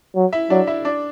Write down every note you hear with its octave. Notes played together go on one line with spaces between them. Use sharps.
F#3
E4 E5
F#3 D4 D5
E4 E5
D4 D5